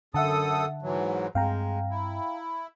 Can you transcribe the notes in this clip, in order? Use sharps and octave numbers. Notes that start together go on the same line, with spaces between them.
F#2 D3 A4 E5 F#5 A5 D#6
G#2 E3 F#3
G2 G#3 C4 F5 G5 A#5
E4